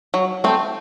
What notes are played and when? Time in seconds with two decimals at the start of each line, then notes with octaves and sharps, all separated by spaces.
0.14 F#3
0.44 A3 C4